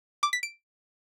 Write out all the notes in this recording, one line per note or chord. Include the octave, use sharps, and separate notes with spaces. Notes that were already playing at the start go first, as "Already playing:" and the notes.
D6
B6
D7